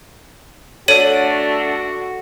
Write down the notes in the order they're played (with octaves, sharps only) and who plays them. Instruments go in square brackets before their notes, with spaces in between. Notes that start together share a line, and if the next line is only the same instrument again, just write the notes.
[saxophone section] A3 D4 [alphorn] F#4 [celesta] A4 [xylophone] C#5 D#7 F#7